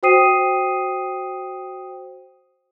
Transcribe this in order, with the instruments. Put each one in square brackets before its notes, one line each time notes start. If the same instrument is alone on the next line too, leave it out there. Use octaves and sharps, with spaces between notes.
[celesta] F#4 C5 G5 D#6 C7 D#7